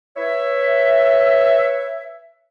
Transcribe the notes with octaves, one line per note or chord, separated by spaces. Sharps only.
B4 C#5 E5